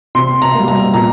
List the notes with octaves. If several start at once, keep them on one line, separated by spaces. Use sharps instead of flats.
C3 C6
A#5
G3 A#3
A#5
A#2 A#5